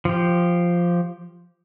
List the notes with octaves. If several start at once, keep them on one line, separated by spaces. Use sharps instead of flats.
F3 G4